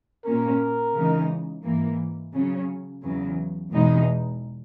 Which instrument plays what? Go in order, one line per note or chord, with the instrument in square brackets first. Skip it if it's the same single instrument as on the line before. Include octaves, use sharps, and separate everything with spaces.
[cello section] A#2 A#3 C#4 [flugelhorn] A#4
[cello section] C#3 E3 G#3 D#4
G#2 E3 A#3
C#3 F#3 C#4
E2 C#3 F#3
E2 B2 G#3 D#4